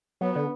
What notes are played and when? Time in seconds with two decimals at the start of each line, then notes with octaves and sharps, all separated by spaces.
0.21 F#3 B3
0.36 D3